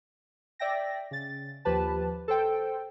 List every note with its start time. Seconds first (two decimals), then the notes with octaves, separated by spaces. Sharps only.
0.59 D5 E5 G5 A#6
1.11 C#3 A6
1.65 D#2 F3 G4 B4 A5
2.28 A4 C5 G5